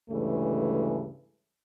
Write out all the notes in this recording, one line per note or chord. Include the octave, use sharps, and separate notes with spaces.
D2 G2 C#3 E3 G#3 A3